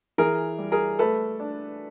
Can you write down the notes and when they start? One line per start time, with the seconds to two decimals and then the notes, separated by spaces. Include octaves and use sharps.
0.18 E3 G#4 A#4
0.58 G3
0.72 G#4 A#4
0.99 A3 A4 B4
1.40 D4